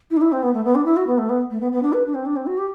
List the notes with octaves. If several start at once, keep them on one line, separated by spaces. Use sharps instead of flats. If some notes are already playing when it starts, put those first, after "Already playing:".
E4
D4
E4
C4
B3
A3
B3
D4
E4
F#4
B3
A3
B3
A3
B3
B3
D4
B4
D4
C4
D4
C4
F#4
G4